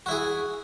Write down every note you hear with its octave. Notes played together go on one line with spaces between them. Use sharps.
E4 F#4 G#4